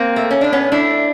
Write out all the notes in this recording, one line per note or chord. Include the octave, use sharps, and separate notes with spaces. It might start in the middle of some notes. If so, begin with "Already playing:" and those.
Already playing: A#3 C4
A3
C#4
A2 D4
B3 C#4
A3 D4 E4